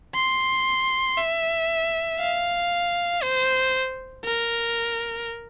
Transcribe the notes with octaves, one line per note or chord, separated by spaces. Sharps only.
C6
E5
F5
C5
A#4